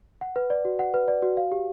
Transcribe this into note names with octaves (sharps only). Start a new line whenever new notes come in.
F#5
B4
D5
F#4
F#5
B4
D5
F#4
F5
G4